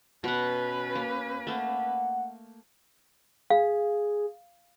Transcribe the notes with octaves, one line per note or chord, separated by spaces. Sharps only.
B2 C#4 B4 F#5
A#3
A3 A#3 F#5
G#4 F5